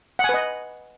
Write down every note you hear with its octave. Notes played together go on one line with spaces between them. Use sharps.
B4 D#5 F#5 G#5